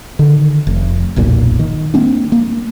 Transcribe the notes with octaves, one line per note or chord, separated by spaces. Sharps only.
D3 D#3
F1
E1 B1 F#2 A#2
D#3
A#3 C4 D4
A#3